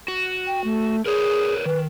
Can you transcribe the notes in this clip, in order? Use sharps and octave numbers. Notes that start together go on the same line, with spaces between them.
F#4
G5
A3
G#4 A#4 B4 C#5
D#3 B4